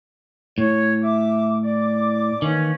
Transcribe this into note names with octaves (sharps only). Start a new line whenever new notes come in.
A2 C#5
E5 D6
D5 D6
D#3 E3 A#3 C#4